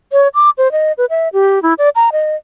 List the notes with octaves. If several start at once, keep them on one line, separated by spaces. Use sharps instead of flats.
C#5
D6
C5
D#5
B4
E5
G4
E4
D5
A#5
D#5